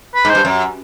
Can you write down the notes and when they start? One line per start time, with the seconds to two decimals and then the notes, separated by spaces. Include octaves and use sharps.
0.15 B4
0.25 G#2
0.30 C5
0.35 G2
0.45 F#2